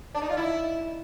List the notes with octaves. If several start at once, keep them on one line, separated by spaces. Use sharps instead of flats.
D4
D#4
F4
E4